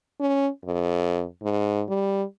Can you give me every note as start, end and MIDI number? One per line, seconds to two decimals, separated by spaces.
0.20 0.48 61
0.65 1.24 41
1.43 1.83 44
1.89 2.23 55